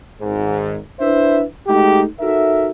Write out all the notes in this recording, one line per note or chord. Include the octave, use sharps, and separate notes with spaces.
G#1 G#2
D4 E4 B4 C5 E5
G#3 A3 D#4 F#4 G4
D#4 F#4 A4 A#4 E5